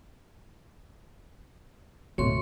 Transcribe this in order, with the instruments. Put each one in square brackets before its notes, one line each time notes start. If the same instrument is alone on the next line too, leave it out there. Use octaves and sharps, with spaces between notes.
[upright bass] D1 [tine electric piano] B2 A3 F#4 [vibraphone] C#5 C6 C#6